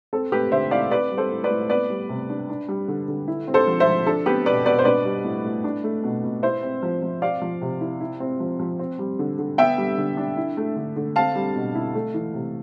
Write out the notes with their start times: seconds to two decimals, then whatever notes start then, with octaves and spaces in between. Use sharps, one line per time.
0.13 C4 A4
0.32 A3 G4 B4
0.52 D3 C5 E5
0.71 E4 D5 F5
0.91 C4 B4 D5
1.11 G3
1.18 A4 C5
1.31 A2
1.44 B4 D5
1.50 A2
1.70 B3 B4 D5
1.90 G3
2.09 C3
2.30 D4
2.49 D4
2.69 G3
2.88 D3
3.08 D3
3.28 E4
3.48 C4
3.54 A4 C5
3.67 F3
3.80 C5 E5
3.87 F3
4.06 D4 A4
4.26 B3 G4 B4
4.46 B2 B4 D5
4.66 B2 B4 D5
4.79 C5
4.85 D4 B4 D5
5.05 G3
5.24 A2
5.45 A2
5.64 D4
5.84 A3
6.04 B2
6.24 B2
6.43 E4 C5 E5
6.63 C4
6.83 F3
7.02 F3
7.22 C4 D5 F5
7.42 F3
7.62 C3
7.81 E4
8.00 E4
8.20 C4
8.40 F3
8.60 F3
8.79 C4
8.99 G3
9.19 D3
9.39 D3
9.58 B3 E5 G5
9.78 G3
9.98 D3
10.17 D4
10.37 E4
10.57 A3
10.76 D3
10.96 D3
11.16 C4 F5 A5
11.35 G3
11.55 B2
11.75 E4
11.95 A3
12.14 E3
12.34 C3